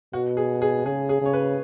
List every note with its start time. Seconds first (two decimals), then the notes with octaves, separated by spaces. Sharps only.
0.13 B2 F#4
0.37 G#4
0.62 G#4
0.85 C#3 G#4
1.09 G#4
1.21 C#3 C#5
1.33 B4